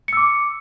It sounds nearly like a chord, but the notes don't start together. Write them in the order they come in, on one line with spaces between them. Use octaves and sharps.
C#7 E6 D6